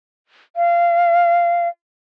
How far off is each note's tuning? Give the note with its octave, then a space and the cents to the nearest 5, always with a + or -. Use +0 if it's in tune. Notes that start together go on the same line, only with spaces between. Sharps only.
F5 -20